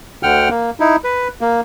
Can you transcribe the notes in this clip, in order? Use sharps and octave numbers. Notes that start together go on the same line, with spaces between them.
D2 D3 F#5 G5 F6
A#3
D#4 E4
B4
A#3